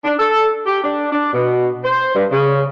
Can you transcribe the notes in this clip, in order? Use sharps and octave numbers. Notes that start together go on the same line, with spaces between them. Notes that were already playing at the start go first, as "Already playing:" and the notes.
D4
A4
G4
D4
D4
B2
C5
G2
C#3